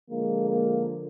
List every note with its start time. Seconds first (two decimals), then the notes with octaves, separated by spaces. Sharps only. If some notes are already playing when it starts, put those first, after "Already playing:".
0.10 D3 F3 G#3 A#3
0.49 A#3